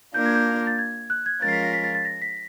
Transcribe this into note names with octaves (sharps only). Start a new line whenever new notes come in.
A#3 D4 F4 A#4 G6
G#6
G6
A6
G#6
F#6
G#6
F3 G#3 C#4 F4 A#4 A6
C7
B6
A#6
B6
A6
A6
A#6
B6